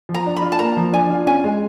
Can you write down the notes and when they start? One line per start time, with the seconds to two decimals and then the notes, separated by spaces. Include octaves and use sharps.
0.09 F3
0.14 A#5
0.26 D4
0.36 B5
0.42 F4
0.52 A5
0.59 A#3 A#5
0.77 F3
0.92 D4 G#5
1.10 F4
1.26 C#4 G#5
1.44 G#3